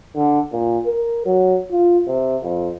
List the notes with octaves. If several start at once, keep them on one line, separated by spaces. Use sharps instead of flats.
D3
A#2
A#4
F#3
F4
C3
F2